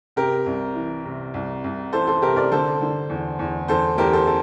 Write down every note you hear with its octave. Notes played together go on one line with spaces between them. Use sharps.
C3 G4 A#4
C2
E3
C3
C2
C2
E3 A4 C5
A4 C5
C3 G4 A#4
A#4 D5
D3 A4 C5
D3
E2
E2
E2 A4 C5
E2 G4 A#4
A4 C5
A4